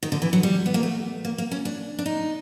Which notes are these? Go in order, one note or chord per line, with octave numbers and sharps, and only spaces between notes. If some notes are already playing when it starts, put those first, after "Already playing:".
D#3
D3
E3
F#3
G3
B3
A#3
A3
A#3
A#3
C#4
D4
D4
D#4